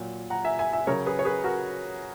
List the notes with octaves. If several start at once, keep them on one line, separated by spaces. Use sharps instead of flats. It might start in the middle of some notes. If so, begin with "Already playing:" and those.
Already playing: A#2 F#3
F#5 A#5
E5 G#5
E5 G#5
E5 G#5
C#3 F#3 A#4 C#5
G#4 B4
C#5
G#4 B4
F#4 A#4